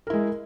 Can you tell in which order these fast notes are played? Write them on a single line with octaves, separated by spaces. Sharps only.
A#4 E4 G#3